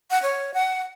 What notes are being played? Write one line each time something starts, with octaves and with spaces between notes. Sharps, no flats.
F#5
C#5
F#5